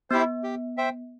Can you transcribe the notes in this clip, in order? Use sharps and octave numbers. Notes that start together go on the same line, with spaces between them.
B3 E4 G4 C5
G4
C5 E5 G5